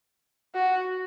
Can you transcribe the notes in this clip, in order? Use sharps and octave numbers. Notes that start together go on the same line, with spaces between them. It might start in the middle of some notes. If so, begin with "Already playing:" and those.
F#4